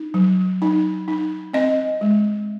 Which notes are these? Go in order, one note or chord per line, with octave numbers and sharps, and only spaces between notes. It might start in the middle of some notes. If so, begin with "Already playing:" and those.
Already playing: D#4
F#3
D#4
D#4
C4 D#5
G#3